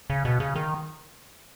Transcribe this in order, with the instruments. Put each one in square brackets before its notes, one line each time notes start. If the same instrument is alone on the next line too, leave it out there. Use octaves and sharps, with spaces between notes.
[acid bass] C#3
B2
C#3
D#3